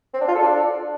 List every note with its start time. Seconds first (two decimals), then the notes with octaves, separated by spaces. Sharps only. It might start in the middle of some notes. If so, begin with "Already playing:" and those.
0.14 C4
0.21 D4
0.28 F4
0.35 A4
0.42 D4